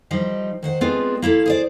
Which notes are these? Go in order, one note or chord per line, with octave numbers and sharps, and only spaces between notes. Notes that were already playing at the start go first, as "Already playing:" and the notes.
F3 G3 D#4
D#3 C5 F#5
G#3 B3 C4 D4 F4 G#4
A#3 E4 F4 A4
G#4 C5 D5